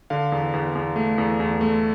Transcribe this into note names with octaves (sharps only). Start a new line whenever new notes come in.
D3 F5
E2
E2
E2
A3
E2
E2
A3